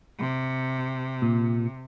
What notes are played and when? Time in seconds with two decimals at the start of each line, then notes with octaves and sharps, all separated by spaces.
0.19 C3
1.22 A#2